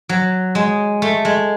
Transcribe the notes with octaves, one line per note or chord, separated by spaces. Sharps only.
F#3
G#3
A3
G#3